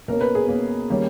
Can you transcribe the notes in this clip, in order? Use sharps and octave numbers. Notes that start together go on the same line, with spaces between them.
B2 A#3 C#4 A#4
B4
G#4
B2 A#3 C#4
D#3 G3 A#3 C#4